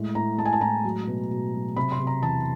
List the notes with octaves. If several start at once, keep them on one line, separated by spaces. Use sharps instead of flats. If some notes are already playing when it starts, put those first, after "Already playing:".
Already playing: A2 G#3
A2 A#5
G#3 A5
G#5
A5
A2 A#5
F#3
B2
B2
F#3
C3 B5
C6
C3
A#5
E2 A5